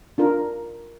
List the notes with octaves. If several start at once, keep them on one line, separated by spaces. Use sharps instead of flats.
D4 F4 A#4